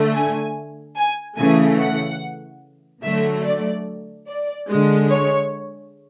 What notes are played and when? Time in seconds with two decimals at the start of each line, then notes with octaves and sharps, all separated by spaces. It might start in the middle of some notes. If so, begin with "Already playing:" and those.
Already playing: D3 A3
0.14 G#5
0.96 G#5
1.37 C#3 E3 A3 G#5
1.79 F#5
3.03 D3 F#3 A3 E5
3.44 D5
4.27 D5
4.68 D3 G#3
5.10 C#5